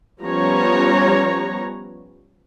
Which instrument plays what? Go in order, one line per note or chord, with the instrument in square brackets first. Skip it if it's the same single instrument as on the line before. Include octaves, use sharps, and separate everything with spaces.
[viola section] F3 G3 B3 C#4 C#5 A#5